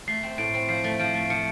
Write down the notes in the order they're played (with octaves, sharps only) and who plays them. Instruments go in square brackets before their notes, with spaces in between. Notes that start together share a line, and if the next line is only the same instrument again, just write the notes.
[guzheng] A3 [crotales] C7
[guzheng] C4
[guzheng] A2 [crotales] D7
[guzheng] C4
[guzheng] F3 [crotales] C7
[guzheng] A3
[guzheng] F3 [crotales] D7
[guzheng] A3
[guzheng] F3 [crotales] C#7